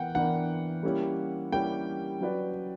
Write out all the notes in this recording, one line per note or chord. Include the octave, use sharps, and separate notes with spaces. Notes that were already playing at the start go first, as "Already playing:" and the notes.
Already playing: E3 B3 A#4 F#5 G5
E3 B3 D4 A#4 F#5
G3 A#3 C#4 E4 G4
G3 A#3 C#4 E4 G4 G5
F#3 C#4 F#4 B4 D5